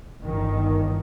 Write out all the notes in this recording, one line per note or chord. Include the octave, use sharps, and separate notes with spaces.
G1 D#3